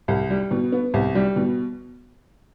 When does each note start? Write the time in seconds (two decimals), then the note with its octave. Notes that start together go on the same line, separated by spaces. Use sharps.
0.08 C2
0.30 G3
0.51 B2
0.72 B3
0.94 C2
1.15 G3
1.36 B2